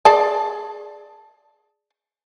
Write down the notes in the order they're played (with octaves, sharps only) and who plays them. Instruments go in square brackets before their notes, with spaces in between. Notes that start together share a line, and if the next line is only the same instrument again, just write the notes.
[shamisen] G#4 D5 A5